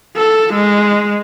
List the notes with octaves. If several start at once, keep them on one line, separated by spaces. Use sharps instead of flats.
A4
G#3